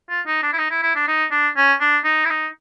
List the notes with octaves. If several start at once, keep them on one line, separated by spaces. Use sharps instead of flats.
F4
D#4
D4
E4
D#4
E4
E4
D4
D#4
D4
C#4
D4
D#4
E4
D#4